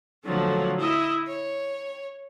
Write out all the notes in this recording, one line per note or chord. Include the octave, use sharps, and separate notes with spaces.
A#2 D3 F3 F#3 A3
E4 D#5 E5
C#5